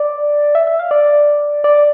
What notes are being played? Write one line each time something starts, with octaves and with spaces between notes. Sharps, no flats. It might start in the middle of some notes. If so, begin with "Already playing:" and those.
Already playing: D5
E5
E5
F5
D5
D5